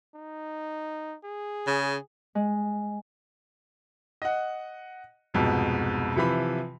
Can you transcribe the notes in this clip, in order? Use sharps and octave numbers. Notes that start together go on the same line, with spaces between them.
D#4
G#4
C#3
G#3
D#5 F#5
C2 F2 G#2 B2
C3 E3 F3 B5